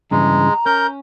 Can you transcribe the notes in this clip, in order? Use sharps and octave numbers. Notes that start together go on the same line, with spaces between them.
G2 C#3 E3 G#3 A#5
C#4 A#4 G6